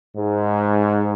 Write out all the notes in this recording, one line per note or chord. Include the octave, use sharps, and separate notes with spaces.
G#2